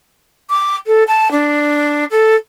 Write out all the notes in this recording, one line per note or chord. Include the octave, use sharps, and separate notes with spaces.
D6
A4
A5
D4
A4